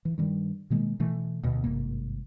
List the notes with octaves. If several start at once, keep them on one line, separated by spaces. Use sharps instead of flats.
E3
G2 D#3 G3
B2 D#3 G#3 A#3
B2 E3 A3
D2 B2
G#1 G2 C3 A#3